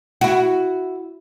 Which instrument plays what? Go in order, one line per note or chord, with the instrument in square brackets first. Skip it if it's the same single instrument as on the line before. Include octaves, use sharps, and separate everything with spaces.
[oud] E4 F#4